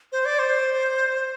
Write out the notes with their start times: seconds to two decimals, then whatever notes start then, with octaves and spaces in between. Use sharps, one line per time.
0.12 C5
0.25 D5
0.39 C5